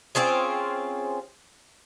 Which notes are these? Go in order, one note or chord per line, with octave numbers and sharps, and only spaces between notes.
C4 C#4 F4 G#4